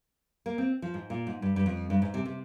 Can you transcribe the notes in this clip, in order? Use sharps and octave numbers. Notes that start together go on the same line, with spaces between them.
A#3
C4
F3
G#2
A#2
G#2
G2
G2
F2
G2
G#2
C3
C3